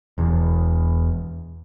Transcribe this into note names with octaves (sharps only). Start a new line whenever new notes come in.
E1 E2